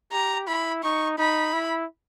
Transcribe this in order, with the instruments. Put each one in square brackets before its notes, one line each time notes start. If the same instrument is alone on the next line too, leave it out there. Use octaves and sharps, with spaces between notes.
[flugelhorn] G4 [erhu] A#5
[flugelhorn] E4 [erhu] B5
[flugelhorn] D#4 [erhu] C#6
[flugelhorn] D#4 [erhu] B5
[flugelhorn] E4